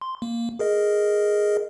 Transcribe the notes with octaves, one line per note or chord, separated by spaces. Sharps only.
C6
A#3
G#4 A#4 D#5